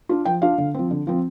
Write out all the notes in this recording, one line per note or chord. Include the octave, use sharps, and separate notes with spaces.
D4 F4
F3 G5
D4 F4 F5
D3
F3 C4
D3
F3 C4